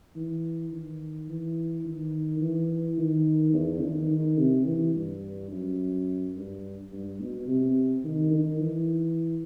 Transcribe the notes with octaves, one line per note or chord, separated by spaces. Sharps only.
E3
D#3
E3
D#3
E3
D#3
E2
D#3
D#3
C3
E3
G2
F#2
G2
G2
B2
C3
D#3
D#3
E3